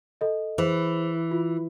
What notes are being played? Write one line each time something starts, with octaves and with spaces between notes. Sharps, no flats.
A4 D#5
E3 G#4 C5
F4